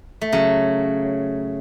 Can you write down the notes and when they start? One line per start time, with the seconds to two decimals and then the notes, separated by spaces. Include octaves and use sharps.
0.21 A3
0.32 C#3 F#3